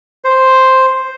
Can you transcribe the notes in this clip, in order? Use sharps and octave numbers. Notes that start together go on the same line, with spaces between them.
C5